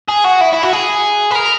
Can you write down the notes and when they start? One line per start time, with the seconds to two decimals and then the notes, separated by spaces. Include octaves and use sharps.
0.09 G#4
0.25 F#4
0.41 E4
0.53 E4
0.63 F#4
0.73 G#4
1.31 B4
1.35 A#4